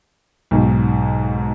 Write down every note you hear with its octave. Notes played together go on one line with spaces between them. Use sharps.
B1 G#2